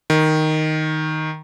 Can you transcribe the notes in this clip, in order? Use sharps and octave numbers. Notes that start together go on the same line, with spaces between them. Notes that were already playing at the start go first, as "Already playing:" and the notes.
D#3